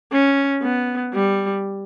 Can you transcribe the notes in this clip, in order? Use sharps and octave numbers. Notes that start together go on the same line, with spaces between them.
C#4
B3
G3